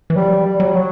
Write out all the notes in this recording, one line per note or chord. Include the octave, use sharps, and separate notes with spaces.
E3
F#3 G3
G3
F#3
F#3